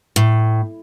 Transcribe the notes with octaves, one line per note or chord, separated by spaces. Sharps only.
A2